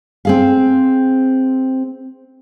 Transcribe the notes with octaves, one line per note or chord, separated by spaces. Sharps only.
C4 G#4 F5